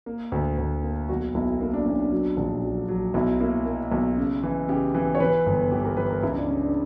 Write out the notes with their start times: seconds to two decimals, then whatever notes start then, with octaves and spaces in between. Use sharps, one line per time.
0.06 A#3
0.32 D2
0.58 D2
0.83 A#3
1.09 B1 F#4
1.35 B1 E4
1.60 A#3 E4
1.73 D4
1.86 B1 C#4
1.99 D4
2.12 F#3
2.37 A#1
2.63 F#3
2.88 F#3
3.14 B1 E4
3.41 A#3 E4
3.66 A#3
3.92 B1
4.17 C#3
4.43 E3
4.69 C#3 G4
4.94 E3
5.15 C#5
5.20 E3 B4
5.46 G1
5.72 E3 G4
5.85 A#4
5.97 E3 B4
6.10 A#4
6.23 C#2 E4
6.36 D4
6.48 C#3 C#4
6.61 D4